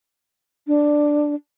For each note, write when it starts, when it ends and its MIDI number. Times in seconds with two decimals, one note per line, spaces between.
0.67 1.35 62